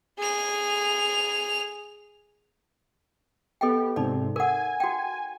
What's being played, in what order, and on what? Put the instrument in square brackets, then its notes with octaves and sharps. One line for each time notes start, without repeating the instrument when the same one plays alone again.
[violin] G#4 F7
[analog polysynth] B3 G4 [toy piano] A4 D#5 G5
[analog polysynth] G#2 C3 C4 [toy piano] D#4 D5
[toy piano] A#4 F#5 [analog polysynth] G#5
[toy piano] F#4 G5